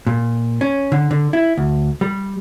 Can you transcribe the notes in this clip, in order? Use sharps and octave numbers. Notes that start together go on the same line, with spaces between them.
A#2
C#4
D3
D3
E4
D2
G3